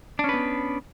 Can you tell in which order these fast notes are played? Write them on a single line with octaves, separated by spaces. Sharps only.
D4 C#4 B4 B3